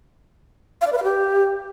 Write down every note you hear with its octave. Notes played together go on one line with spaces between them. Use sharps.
F5
D5
B4
F5
G4